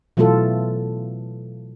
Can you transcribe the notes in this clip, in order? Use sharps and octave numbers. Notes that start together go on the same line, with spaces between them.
B2 E3 F#3 A3 F4 A4